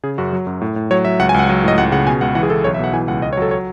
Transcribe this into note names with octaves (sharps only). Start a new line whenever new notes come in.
C#3 G#4
F#2 F#4
F#3
F#2
A2
A2
F#3 C#5
F#3 E5
C#2 F#5
G#5
C#2 F#5
F#3
A2 D#5
C#2 F#5
C#3 F#5
B2 G#5
C#2 F#5
E3 F#5
G#4
E3 A4
B1 C#5
E5
B2 F#5
E3 G#5
C#2 F#5
C#2 D#5
C#5
F#3 A4
C#5